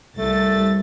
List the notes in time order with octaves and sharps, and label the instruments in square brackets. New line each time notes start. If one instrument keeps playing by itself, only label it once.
[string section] C2 A6 [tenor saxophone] A3